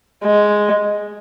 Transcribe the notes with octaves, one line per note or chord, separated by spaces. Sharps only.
G#3